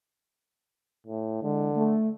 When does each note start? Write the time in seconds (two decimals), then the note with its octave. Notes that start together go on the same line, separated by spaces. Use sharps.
1.07 A2
1.43 D3 E3 G#3
1.76 A3